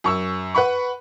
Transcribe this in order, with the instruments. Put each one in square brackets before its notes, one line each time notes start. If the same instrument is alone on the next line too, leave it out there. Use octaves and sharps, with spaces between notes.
[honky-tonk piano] F#2 C#6 E6
B4 F#5 B5 C#6